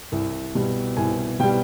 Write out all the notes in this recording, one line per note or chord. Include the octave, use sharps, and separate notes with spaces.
C2
B2 G3
C2 G#5
B2 G3 G5